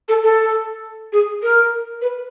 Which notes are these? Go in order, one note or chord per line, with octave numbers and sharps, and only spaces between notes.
A4
A4
G#4
A#4
B4